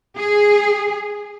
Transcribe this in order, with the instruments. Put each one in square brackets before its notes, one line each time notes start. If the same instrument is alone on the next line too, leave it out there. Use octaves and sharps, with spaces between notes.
[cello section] G#4